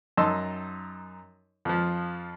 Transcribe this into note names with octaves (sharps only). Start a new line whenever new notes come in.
F#2 D#4 D#5 A5 C6 E6
F2 F3